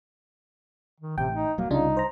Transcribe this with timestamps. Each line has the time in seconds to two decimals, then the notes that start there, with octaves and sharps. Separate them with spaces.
1.00 D#3
1.18 A1 C3 G5
1.33 D#4
1.58 D#1 F#3 A#3
1.70 C2 C#3 D4 D#4 F4
1.97 C5 A#5